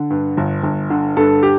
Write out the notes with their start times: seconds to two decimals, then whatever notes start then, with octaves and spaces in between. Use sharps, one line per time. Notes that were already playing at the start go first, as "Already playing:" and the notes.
Already playing: D3
0.10 G2
0.37 G1
0.63 G1
0.90 D3
1.17 G2 A4
1.43 G4